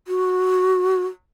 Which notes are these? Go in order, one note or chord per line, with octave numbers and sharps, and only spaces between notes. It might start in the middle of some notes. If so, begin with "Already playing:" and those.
F#4